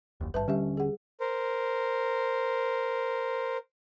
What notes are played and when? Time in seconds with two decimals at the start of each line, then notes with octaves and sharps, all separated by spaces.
0.21 F#1 D#2
0.34 G#1 G2 B4 E5 A5
0.48 D#1 D3 G3 C#4 G4 E5
0.77 G#4 F#5
1.20 A#4 C5